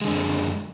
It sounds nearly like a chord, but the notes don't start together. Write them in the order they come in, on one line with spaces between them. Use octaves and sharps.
G#3 D3 F#2